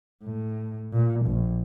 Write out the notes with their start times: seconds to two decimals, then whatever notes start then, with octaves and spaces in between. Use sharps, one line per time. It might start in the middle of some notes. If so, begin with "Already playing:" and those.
0.24 A2
0.93 A#2
1.27 A#1